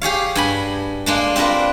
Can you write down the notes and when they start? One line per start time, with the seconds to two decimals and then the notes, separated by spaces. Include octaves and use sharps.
0.01 G4 G#4 C#5 F5
0.35 G2 G#5 B5
1.06 G#3 A#3 D4
1.36 C4 D4 F4 A#4 B4